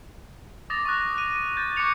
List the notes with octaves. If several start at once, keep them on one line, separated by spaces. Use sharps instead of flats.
D6 D#6 A6 A#6 F7
C#6 D#6 F#6
F#6 D#7
D#7
G6 A6
C#6 D6 F#6 G#6 C#7 F7